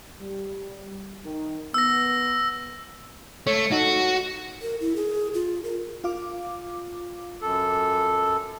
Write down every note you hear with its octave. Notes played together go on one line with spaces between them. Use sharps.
G3
D#3
B3 E6 A#6
A3 C#5
D#4 F#4 A4
A#4
E4
G#4
F4
A#4
F4 F5 D6
F#2 A4